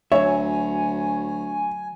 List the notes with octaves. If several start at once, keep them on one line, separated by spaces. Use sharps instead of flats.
D2 F#3 C#5 E5 G#5